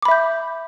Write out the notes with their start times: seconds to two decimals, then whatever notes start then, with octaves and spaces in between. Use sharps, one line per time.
0.02 D6
0.05 B5
0.08 E5
0.11 G6